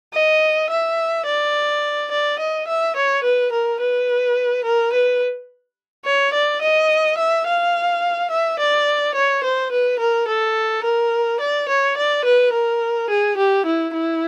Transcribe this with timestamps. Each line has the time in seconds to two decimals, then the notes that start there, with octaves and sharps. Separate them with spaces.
0.14 D#5
0.71 E5
1.26 D5
2.11 D5
2.39 D#5
2.68 E5
2.96 C#5
3.24 B4
3.52 A#4
3.80 B4
4.65 A#4
4.93 B4
6.06 C#5
6.34 D5
6.61 D#5
7.18 E5
7.47 F5
8.31 E5
8.59 D5
9.15 C#5
9.44 C5
9.72 B4
9.99 A#4
10.28 A4
10.84 A#4
11.40 D5
11.69 C#5
11.97 D5
12.25 B4
12.53 A#4
13.10 G#4
13.37 G4
13.66 E4
13.94 E4